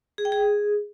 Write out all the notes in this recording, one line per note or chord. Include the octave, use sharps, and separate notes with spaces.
G#4
G5
G#4